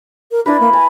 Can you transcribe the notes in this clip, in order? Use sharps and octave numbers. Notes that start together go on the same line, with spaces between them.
A#4
D4 E4 A#4 B4
A#3
G#5 A5